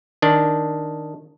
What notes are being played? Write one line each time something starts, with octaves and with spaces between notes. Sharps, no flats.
D#3 D4